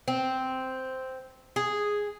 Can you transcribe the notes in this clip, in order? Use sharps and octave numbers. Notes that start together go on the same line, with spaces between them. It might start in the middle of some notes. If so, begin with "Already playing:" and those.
C4
G#4